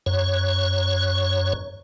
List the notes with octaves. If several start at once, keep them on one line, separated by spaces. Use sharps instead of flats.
F#2 C#5